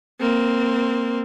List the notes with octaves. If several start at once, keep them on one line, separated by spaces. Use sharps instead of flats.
A#3 C4